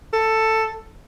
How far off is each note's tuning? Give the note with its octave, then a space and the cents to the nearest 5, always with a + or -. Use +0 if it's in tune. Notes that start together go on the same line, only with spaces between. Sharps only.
A4 +10